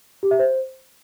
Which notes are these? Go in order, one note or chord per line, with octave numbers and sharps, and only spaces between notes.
G4
E5
C5